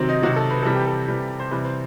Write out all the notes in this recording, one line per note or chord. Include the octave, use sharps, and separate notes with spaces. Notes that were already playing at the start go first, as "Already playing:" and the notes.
Already playing: C3 D#3 F#3 C4
D#4
C3 D#3 F#3 F#4
A4
B4
C3 E3 G3 A4
G4
A4
C3 E3 G3
C5
C3 E3 G3 B4
C5